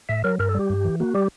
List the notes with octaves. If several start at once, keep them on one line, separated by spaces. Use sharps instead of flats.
A2 E5
F#3 A#4
G2 A#4
A4
G3 G4
G2
E3
A#3 F#4
G3 G4